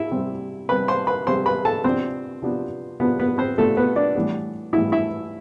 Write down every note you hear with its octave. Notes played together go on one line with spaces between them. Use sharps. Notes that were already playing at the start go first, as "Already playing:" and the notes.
Already playing: E4 E5
C3 G3 C4
C3 G3 C4 B4 B5
C5 C6
B4 B5
C3 G3 C4 C5 C6
B4 B5
A4 A5
C3 F3 B3 C4 D4 C5
C3 F3 B3 D4
C3 F3 B3 D4 B4
B3 B4
C4 C5
C3 F3 A3 B3 D4 A4
B3 B4
D4 D5
A2 E3 G3 B3
A2 E3 G3 B3 E4 E5
E4 E5